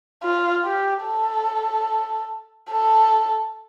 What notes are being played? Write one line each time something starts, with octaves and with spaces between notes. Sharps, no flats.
F4
G4
A4
A4